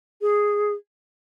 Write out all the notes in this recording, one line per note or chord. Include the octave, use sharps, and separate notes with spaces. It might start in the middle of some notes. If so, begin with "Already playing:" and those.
G#4